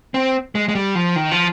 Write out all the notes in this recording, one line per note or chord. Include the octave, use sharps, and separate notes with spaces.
C4
G#3
G#3
G3
F3
D#3
F3